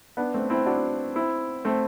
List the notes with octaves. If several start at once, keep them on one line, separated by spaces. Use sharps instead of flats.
B3 D4
A3 C4
C4 E4
D4 F#4
C4 E4
A3 C4